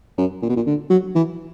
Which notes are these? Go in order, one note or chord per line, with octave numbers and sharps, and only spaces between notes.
F#2
A#2
B2
A#2
D3
F#3
E3